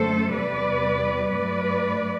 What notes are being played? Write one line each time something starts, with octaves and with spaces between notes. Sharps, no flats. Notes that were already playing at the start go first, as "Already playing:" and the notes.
Already playing: F#2 D3 A3 A4 C5
E2 C3 G3 B4 D5
G2 F#3 A3 B4 D5